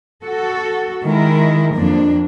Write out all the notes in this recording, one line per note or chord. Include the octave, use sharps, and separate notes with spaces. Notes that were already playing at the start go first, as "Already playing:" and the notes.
F#4 A4
D#3 G#3 E4 A#4
F2 A#3 D4